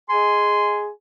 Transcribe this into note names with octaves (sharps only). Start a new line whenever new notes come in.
G#4 D#5 G#5 C6